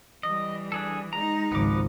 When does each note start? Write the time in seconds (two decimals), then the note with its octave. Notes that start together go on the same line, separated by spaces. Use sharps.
0.23 E3 G3 D#5
0.72 D4 G#4 A4
1.13 G#3 D#4 A#5
1.52 G#1 C#2 F3 B3 D6